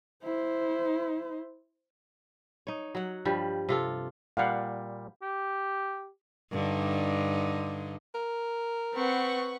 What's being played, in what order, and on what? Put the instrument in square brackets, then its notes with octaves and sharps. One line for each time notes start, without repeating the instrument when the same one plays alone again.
[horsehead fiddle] E4 C5
[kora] D#4 C#5
F#3 F#5
G2 F3 G3
C3 F4 A4
[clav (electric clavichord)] A#2 G3 [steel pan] F5 F#5
[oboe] G4
[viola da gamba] G2 D3 D#4
[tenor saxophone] A#4
[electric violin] C4 [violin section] B4 F#5 C#6